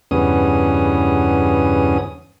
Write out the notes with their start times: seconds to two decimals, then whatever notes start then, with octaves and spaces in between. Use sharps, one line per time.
0.11 E2 G2 C#3 B3 C#4 D#6